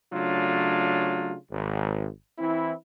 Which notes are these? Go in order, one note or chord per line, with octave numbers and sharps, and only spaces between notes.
C#3 F#3 A3 D4 F4
G#1
E3 C4 E4